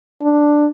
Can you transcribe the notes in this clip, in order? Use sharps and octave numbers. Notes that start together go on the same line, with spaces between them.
D4